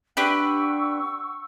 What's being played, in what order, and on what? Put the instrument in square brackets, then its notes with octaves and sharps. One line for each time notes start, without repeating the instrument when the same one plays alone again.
[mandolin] D4 G4 B4 [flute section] F#5 C#6 E6